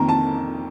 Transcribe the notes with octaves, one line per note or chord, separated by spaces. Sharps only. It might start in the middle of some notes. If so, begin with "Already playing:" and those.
Already playing: F2 D#3 A#3 A#5
A5